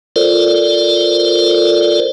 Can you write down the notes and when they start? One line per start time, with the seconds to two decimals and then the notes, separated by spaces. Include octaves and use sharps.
0.16 F4 A4 A#4 C5 D5